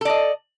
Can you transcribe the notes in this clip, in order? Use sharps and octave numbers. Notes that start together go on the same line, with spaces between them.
A4 D5 D#5